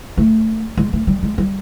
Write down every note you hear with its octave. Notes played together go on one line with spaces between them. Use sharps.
A3
G#3
A3
G3
G#3
G3